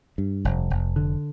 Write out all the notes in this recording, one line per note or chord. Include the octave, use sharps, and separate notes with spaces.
G2
F1
F1
D3